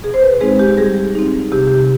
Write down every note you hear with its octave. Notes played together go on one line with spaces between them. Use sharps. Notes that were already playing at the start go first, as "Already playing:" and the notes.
B2 G#4
C5
B4
G#3 C4 D#4 G#4
G4
G3 G#4
C4 D#4
C3 G4
G4